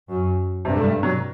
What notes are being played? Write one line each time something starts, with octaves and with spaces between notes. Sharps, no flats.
F#2
G2 C3
A3
G3
F#3